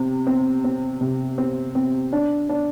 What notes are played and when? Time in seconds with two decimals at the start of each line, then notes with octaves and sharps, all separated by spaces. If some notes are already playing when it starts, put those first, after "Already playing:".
Already playing: C3 C4
0.27 C4
0.64 C4
1.01 C3
1.38 C4
1.75 C4
2.13 D4
2.49 D4